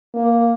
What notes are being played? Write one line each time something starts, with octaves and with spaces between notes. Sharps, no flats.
A#3